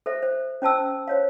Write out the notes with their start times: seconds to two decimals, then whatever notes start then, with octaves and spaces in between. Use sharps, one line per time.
0.06 A4 C5 E5
0.23 C5
0.62 C#4 C5 A5 E6
1.08 C5 C#5 F5